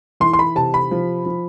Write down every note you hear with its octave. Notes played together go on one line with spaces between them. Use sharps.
E3 C6
C6
B5
C3 A5
B5
F3
F3